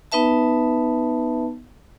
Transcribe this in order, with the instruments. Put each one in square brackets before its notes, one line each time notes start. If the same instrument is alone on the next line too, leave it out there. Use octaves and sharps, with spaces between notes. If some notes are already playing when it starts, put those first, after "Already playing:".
[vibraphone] B3 D#4 B4 E5 A5